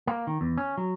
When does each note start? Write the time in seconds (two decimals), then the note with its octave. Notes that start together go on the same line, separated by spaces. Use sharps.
0.07 A#3
0.27 D#3
0.41 E2
0.58 C#4
0.78 F#3